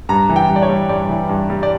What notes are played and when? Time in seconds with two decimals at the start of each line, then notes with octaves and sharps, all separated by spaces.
0.09 G2 A#5
0.29 E3
0.36 G5
0.49 G2
0.56 D5
0.62 C#5
0.69 G3
0.89 G2 D5
1.09 E3
1.29 G2
1.50 G3
1.63 D5